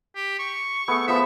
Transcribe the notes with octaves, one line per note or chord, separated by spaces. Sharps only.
G4
C#6
A3 B3 G#4
F3 B3 E5